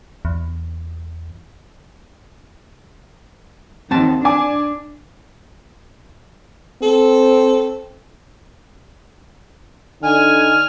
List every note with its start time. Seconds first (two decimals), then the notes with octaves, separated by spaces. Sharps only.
0.25 E2
3.91 D#2 C4 F#5 A5
4.25 D4 G#5 D6
6.82 C4 A4
10.02 D3 D#4 G#5 F6